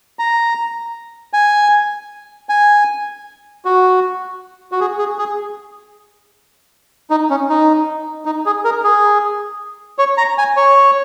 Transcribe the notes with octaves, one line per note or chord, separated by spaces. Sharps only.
A#5
G#5
G#5
F#4
F#4
G#4
G#4
G#4
D#4
C#4
D#4
D#4
G#4
A#4
G#4
C#5
A#5
G#5
C#5